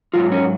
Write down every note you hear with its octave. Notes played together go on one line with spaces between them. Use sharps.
G#2 D#3 F#3 F4
C#4